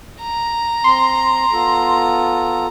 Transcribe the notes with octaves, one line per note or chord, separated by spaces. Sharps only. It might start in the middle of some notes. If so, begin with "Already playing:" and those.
A#5
C4 C6
B3 F4 A4